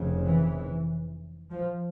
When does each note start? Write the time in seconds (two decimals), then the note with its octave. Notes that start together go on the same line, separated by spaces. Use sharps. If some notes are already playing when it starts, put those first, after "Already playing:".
Already playing: F1 F2 C#3
0.26 E3
1.51 F3